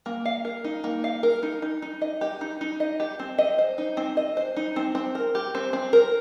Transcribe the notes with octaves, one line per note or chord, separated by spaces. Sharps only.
A#3
F5
A#4
D#4
A#3
F5
A#4
D#4
D#4
D#4
D#5
G4
D#4
D#4
D#5
G4
C4
D#5
C5
D#4
C4
D#5
C5
D#4
C4
C4
A#4
G4
C4
C4
A#4